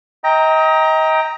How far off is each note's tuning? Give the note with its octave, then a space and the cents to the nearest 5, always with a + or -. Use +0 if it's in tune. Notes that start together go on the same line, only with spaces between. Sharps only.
D#5 +30 G5 +10 A#5 +0